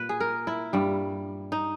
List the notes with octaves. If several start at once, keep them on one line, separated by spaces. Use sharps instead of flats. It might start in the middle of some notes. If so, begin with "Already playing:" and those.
Already playing: A#2 B4
G#4
A#4
E4
G2 G3
D#4